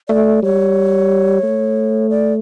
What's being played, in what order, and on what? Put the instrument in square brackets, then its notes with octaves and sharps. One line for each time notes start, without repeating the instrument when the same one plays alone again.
[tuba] A3 [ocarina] D5
[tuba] G3 [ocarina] C#5
[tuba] A3
[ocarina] D5